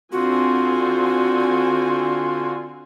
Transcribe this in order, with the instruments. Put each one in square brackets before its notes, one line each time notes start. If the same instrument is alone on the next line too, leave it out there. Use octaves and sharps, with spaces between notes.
[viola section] D3 C4 G#5 [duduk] F4 [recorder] F#4